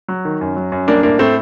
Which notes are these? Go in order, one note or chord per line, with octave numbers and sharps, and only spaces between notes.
F#3
D#3
F#2
F#3
F#2
G3 A#3 D4
A2 A#3 D4
A2 A3 C4